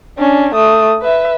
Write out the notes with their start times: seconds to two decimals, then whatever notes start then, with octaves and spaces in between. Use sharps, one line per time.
0.18 C#4 D4
0.55 A3 D#6
1.02 B4 E5